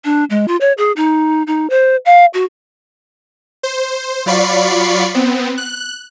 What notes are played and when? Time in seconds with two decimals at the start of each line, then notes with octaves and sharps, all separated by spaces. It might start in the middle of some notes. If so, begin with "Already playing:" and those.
0.05 D4
0.30 G#3
0.48 F4
0.61 C#5
0.78 G#4
0.96 D#4
1.47 D#4
1.70 C5
2.06 F5
2.34 F#4
3.63 C5
4.26 F#3 F4 D5 B5 C#6 C7
5.14 B3 C4
5.58 F#6